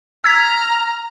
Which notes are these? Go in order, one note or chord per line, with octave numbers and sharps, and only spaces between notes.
A#5 E6 F6 G#6 B6